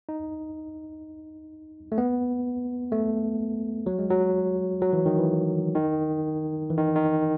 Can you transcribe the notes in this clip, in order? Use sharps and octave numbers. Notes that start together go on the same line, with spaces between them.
D#4
A3
B3
A3
F#3
G#3
F#3
F#3
E3
D#3
E3
D#3
E3
D#3
D#3